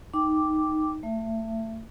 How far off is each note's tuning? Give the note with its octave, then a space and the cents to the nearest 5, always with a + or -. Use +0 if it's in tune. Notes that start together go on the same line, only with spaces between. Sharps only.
D#4 +0 G5 +0 D6 +0
A3 +30 E5 +25